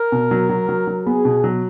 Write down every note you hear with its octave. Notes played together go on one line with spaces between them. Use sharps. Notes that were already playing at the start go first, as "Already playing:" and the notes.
Already playing: A#4
B2
F#3
F#3
F#3
F#3
B3 G#4
B2
F#3